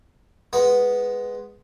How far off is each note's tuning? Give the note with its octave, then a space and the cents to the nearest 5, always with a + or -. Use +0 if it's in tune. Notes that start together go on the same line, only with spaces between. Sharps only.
G#3 +0 B3 +0 B4 +0